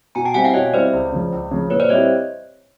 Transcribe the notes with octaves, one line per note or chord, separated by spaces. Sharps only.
B2 G#5 A#5
G5 A5
G3 C4 E4 F#5 G#5
F5 G5
B2 C#5 D#5
G3 C4 E4 C5 D5
C#2
C#3 F3
C#2
C#3 F3
A#2 B4 C#5
C5 D5
G3 C4 E4 G4 C#5 D#5